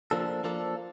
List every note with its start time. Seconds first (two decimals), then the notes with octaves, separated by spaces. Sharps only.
0.11 F3 A#3 D4 A4
0.44 F3 A#3 D4 A4